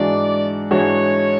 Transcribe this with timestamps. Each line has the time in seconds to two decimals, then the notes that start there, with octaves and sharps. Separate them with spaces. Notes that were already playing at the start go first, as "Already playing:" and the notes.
Already playing: G#2 E3 G#3 D4 F#4 D5
0.71 G#2 E3 G#3 D4 F#4 C#5